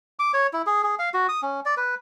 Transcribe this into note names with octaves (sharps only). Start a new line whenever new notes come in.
D6
C#5
E4
G#4
G#4
F5
F#4
D#6
C#4
D5
B4